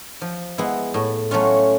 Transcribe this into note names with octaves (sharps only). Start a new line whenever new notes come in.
F3
G#3 B3 E4
A2
F#3 A3 C#4 F4